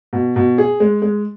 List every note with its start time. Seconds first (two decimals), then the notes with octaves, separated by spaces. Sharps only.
0.13 B2
0.36 B2
0.58 G#4
0.80 G#3
1.02 G#3